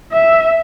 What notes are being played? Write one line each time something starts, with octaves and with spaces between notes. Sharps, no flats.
E5